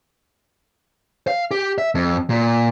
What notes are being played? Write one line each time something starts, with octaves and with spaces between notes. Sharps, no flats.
F5
G4
E5
F2
A#2